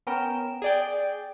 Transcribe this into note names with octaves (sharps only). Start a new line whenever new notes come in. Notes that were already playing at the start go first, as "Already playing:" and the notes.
B3 C#4 A#4 G5 E7
G#4 D5 G5